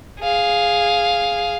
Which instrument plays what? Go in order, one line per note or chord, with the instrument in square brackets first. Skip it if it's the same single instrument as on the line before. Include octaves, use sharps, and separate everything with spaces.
[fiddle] G#4 F5